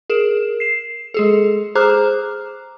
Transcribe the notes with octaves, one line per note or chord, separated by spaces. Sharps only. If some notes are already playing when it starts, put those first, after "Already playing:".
G#4 A#4 E7
C7 E7
G#3 G#4 A4
G#4 C5 A#5 D6 F6 F#6